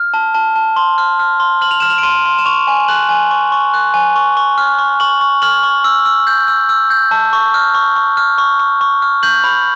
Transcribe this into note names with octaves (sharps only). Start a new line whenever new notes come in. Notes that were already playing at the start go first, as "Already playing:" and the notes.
Already playing: F6
A5
A5
A5
C6
F6
F6
C6
F6 F#7
F7
F6 E7
F7
D7
C6 D#7
C6
E7
C#6 F7
G#5
F#6 F#7
G#5
C#6
C#6
F#6
G#5
C#6
C#6
F6
C#6
C#6 F#7
C#6
F6 F#7
C#6
E6
E6
G6
E6
E6
G6
A5
C#6
F6
C#6
C#6
F6
C#6
C#6
C#6
F6
G6 F#7
B5